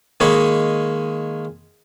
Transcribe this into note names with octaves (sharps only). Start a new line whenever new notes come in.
D#3 G#3 A#3 G#4 C#5 B5